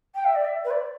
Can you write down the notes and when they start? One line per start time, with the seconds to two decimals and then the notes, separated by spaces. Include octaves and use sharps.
0.15 G5
0.25 E5
0.35 D5
0.45 E5
0.64 B4
0.70 D5